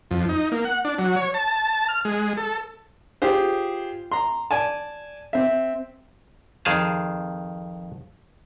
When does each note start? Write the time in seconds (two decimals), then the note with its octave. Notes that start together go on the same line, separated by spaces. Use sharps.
0.11 F2
0.29 D#4
0.52 A#3
0.65 F#5
0.85 D4
0.99 F#3
1.16 C#5
1.34 A5
1.88 F6
2.05 G#3
2.37 A4
3.22 F4 G4 G#4 C5
4.12 A#5 C6
4.51 D5 G#5 A5
5.33 C4 E5
6.65 F2 D#3 G#4 F5 A5